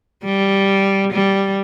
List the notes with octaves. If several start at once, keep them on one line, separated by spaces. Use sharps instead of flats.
G3
G3